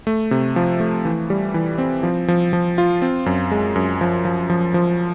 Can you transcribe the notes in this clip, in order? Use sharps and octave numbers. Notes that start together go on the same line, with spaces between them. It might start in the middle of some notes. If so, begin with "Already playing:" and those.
A3
C3
F3
A3
E3
G3
E3
C4
F3
F3
F3
F4
C4
F#2
G#3
F#2
F3
F3
F3
F3